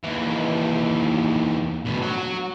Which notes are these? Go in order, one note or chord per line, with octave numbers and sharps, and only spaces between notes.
D#2 E3
D2 B2
F#3 F#4